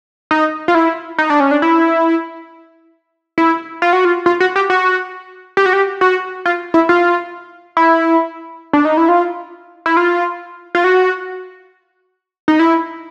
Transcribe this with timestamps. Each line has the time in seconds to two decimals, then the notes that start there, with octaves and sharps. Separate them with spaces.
0.31 D#4
0.68 F4
0.75 E4
1.18 D#4
1.30 D4
1.40 C#4
1.51 D4
1.62 E4
3.38 E4
3.82 F4
3.93 F#4
4.05 F4
4.26 F4
4.40 F#4
4.56 G4
4.70 F#4
5.57 G4
5.66 F#4
5.73 G4
6.01 F#4
6.46 F4
6.74 E4
6.89 F4
7.77 E4
8.73 D4
8.85 D#4
8.97 E4
9.09 F4
9.86 E4
9.97 F4
10.75 F4
10.84 F#4
12.48 D#4
12.59 E4